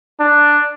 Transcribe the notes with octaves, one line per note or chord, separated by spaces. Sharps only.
D4